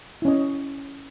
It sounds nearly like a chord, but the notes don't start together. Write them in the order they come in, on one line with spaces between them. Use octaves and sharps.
E4 C#4 D#5